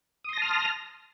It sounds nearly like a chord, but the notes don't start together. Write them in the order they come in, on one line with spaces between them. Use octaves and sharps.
D#6 C6 A#6 A5 F6